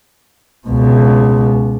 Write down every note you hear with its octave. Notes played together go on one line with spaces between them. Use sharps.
C#2 B2